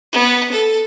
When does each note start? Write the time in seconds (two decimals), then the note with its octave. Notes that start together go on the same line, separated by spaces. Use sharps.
0.12 B3
0.51 A4